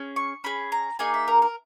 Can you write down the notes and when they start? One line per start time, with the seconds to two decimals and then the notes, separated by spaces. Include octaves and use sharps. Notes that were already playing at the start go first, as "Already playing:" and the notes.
Already playing: C#4 G#4
0.16 C#6
0.44 C#4 G#4 B5
0.72 A#5
0.99 A#3 D#4 G#4 G#5
1.14 E5
1.28 A#4
1.42 A#4